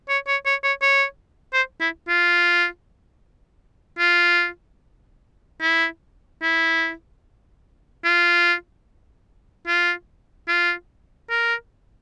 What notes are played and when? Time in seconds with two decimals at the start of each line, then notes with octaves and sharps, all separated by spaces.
0.09 C#5
0.27 C#5
0.46 C#5
0.63 C#5
0.82 C#5
1.53 C5
1.80 E4
2.09 F4
3.98 F4
5.61 E4
6.42 E4
8.05 F4
9.67 F4
10.48 F4
11.30 A#4